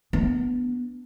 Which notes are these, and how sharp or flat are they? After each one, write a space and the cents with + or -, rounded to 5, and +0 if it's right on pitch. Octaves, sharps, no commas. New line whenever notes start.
B3 +0 D4 +0